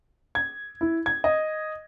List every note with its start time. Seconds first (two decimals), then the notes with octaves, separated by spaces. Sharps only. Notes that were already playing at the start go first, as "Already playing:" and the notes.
0.35 G#6
0.81 E4
1.06 G#6
1.24 D#5